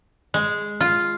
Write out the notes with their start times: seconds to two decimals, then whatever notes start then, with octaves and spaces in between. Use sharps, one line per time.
0.34 G#3
0.81 F4